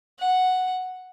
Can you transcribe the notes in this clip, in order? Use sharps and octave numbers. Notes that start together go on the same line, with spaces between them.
F#5